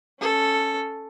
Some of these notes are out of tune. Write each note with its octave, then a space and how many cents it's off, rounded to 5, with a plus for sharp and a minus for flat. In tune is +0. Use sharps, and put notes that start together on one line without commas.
C#4 +0 A4 +0